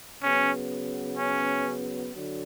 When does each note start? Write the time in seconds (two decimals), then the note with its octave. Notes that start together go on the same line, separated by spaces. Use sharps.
0.22 C#3 F#3 B3 C#4
1.17 C#4
2.12 D3 F#3